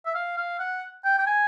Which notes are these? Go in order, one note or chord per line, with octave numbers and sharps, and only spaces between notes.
E5
F5
F5
F#5
G5
G5
G#5